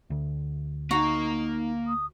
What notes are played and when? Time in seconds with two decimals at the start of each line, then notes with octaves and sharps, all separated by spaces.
0.10 D2 D3
0.91 A#3 D#4 F#4 A#5
1.88 D#6